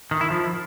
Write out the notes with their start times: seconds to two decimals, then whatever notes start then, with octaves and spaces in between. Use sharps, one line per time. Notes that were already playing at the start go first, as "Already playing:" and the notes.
0.11 D#3
0.21 E4
0.30 F3